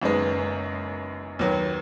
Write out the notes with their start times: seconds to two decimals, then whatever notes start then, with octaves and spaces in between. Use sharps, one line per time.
0.02 F#1 F#2 D#3 G#3 B3
1.39 D#2 D#3 F#3 B3